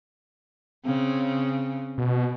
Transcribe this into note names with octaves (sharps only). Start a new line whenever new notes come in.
C#3 C4
B2